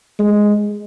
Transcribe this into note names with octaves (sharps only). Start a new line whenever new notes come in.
G#3